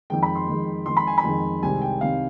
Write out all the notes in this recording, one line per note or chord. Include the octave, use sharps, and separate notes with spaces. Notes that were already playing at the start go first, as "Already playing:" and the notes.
F2 D#3 G#3 G5
B5
C6
F2 D#3 G#3
F2 D#3 G#3 C6
B5
G#5
B5
F2 D#3 G#3
C2 C3 D#3 G#3 C4 G#5
G5
C3 D#3 G#3 C4 F5